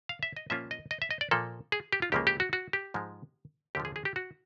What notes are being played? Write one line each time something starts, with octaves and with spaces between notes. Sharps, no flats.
F5
E5
D#5
A#2 F3 A#3 C#4 F4 E5
D#5
D#5
E5
D#5
D5
A#2 F3 A#3 A4
G#4
G4
F4
C#2 C#3 F3 A#3 G4
G4
F#4
F#4
G4
G#2 F3 G#3
D#2 D3 F3 G4
G#4
G#4
G4
F#4